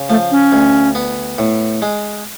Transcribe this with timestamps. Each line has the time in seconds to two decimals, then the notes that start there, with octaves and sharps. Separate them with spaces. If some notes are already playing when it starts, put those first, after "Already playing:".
Already playing: C#3
0.09 F3 A3
0.31 C#4
0.52 D2
0.95 B3
1.38 A2
1.82 G#3